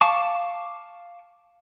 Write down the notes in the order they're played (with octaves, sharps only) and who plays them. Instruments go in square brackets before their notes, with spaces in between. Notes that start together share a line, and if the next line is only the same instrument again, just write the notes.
[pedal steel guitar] F5 A5 C#6 D6